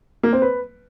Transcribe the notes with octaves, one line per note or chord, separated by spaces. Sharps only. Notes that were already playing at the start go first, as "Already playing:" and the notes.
A#3
C4
B4